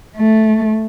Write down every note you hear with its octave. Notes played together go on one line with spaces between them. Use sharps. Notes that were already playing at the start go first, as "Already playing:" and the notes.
A3